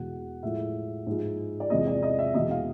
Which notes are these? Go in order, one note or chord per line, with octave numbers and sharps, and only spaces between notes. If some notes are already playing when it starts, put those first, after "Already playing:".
Already playing: E2 B2 G#3 F#5
A2 F3 G#3 E5
G#2 F3 G#3
D5
E2 C3 F3 G#3 D#5
D5
D#5
E5
E2 B2 G#3 D#5
F5